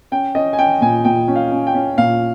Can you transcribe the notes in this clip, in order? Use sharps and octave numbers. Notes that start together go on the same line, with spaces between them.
C#4 G5
C#4 D#5
G#5
C#4 G5
A#2 G#5
A#2 G5
C#4
F5
C#4
G5
C#4
A#2 F5